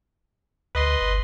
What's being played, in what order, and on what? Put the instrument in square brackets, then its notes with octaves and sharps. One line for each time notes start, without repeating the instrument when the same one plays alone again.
[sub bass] D2 [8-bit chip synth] B4 D#5 C6
[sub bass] G1